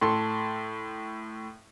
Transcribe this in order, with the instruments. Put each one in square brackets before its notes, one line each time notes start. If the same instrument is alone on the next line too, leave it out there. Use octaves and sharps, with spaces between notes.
[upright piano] A2 A4 C6